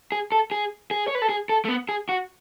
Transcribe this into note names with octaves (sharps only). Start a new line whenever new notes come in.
G#4
A4
G#4
G#4
C#5
B4
A4
G#4
A4
A3
B3
G#4
F#4